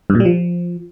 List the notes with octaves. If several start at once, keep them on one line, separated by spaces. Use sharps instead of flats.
G2
A#2
G3
F3